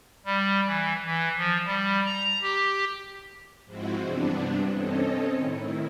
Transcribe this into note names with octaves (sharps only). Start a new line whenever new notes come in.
G3
E3
E3
F3
G3
A#5
G4
G#2 F3 G#3 C4 E4 F#4
G2 C3 E3 B3 D4
C4 C#4 A4 C#5 D#5
A2 D#3 E4